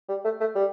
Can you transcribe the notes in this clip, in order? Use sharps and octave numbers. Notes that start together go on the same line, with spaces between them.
G3
A3
A3
G3